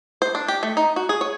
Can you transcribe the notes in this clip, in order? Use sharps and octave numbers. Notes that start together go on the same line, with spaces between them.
C5
D4
G4
A3
D#4
F#4
G#4
C#5